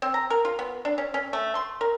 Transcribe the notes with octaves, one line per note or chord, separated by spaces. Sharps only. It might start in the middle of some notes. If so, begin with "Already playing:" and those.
C4
A#5
A#4
F4
B3
D4
C#4
C#4
A3
C6
A#4